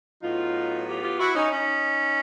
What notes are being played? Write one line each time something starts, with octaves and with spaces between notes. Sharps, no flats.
A2 F#3 B3 D#4 F4
F4 G4
F4 G4
E4 F#4
C#4 D#4
C#4 D#4